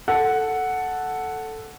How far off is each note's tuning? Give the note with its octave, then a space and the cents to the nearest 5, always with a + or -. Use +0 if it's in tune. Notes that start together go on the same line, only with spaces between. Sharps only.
A4 +0 F#5 +0